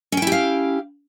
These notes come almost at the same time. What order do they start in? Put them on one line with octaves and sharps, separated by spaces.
C#4 G5 E4 G4 F5